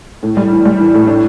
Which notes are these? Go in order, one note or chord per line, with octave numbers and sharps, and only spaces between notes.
A2
G3
E3
G3
E3
A2
D4